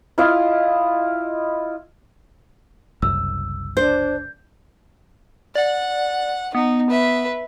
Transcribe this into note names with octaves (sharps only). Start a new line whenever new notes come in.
E4 F4 D#5 F5
F#1 C2 F#2 E6
D4 C5 G6
D5 F#5
B3 D#4
B4 E5